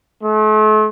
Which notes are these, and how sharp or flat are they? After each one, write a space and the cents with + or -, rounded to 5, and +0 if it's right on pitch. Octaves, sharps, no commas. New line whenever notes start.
A3 -40